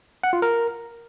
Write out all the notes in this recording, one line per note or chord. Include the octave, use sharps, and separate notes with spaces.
F#5
F4
A#4